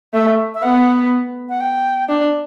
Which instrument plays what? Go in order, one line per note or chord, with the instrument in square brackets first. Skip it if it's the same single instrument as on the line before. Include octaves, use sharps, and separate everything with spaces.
[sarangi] A3 [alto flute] E5
[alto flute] E5
[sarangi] B3 [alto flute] F#5
[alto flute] F#5
G5
[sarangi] D4